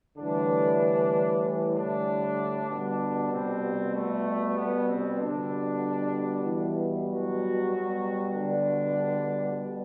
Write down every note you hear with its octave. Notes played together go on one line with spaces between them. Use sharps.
A2 D3 E3 G3 D4
E3 E4
D3 D4
B2 D3 G3 D4
C3 C4
A3
B3
C3 C4
B2 D3 G3 D4
E3 E4
F#3 F#4
B2 G3
D3 D4